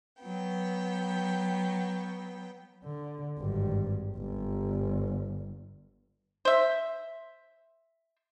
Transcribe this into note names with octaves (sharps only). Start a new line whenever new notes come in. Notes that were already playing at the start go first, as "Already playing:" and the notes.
F#3 B3 G5
D3
G#1 G2
G1
C5 E5